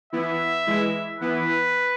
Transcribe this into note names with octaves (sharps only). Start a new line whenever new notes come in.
E3 B3 E4 E5
E3 G#3 E4
E3 B3 E4 B4